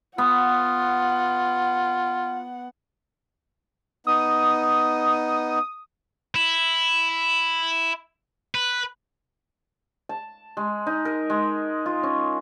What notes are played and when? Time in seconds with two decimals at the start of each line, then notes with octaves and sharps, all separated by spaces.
0.18 B3 F4 F#5
4.07 B3 D#4 D#6
6.35 E4
8.55 B4
10.09 A5
10.57 G#3
10.87 D#4
11.05 A#4
11.30 G#3
11.86 F4
12.03 C#4